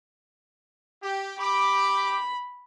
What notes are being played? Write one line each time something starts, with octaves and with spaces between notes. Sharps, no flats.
G4
G4 B5 D6